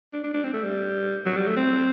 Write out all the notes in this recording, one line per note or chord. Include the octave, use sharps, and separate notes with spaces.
D4
D4
D4
C4
A3
G3
F#3
G3
A3
C4